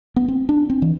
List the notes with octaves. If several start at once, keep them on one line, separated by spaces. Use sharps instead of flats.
B3
C4
D4
C4
E3